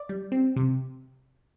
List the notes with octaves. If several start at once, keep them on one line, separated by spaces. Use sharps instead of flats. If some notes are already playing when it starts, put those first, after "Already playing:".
Already playing: D5
G3
C4
C3